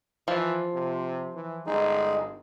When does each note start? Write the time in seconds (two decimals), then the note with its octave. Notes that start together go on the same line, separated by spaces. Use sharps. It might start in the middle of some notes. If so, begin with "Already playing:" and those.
0.28 E3 F3 F4
0.74 C3
1.35 E3
1.66 G1 G#3 D#4 G#4